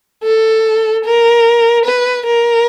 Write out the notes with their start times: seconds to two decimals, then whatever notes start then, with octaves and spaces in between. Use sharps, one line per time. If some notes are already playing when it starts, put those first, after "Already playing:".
0.24 A4
1.05 A#4
1.86 B4
2.26 A#4